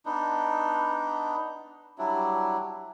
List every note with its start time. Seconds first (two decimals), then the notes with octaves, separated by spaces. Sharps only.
0.06 B3 D4 D#4
1.98 F#3 G3 D4 E4